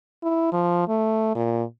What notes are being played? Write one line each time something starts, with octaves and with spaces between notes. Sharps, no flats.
E4
F3
A3
A#2